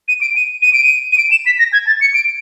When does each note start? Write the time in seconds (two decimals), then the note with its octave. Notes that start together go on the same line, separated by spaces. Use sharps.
0.08 D#7
0.21 D7
0.36 D#7
0.62 D#7
0.73 D7
0.84 D#7
1.12 D#7
1.18 D7
1.31 E7
1.46 B6
1.59 A#6
1.73 G#6
1.87 A6
2.01 C#7
2.14 D7